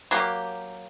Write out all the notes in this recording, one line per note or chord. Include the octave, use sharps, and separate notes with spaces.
F#3 A#3 G4